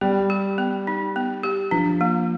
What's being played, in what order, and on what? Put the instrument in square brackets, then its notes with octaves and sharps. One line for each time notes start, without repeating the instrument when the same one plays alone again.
[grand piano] G3 [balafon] B3
[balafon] G4
B3
D#4
B3
G4
[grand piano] F3 [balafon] D4
[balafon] A#3